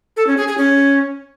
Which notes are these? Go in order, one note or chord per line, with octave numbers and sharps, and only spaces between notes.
A4
C#4
G#4
G#4
C#4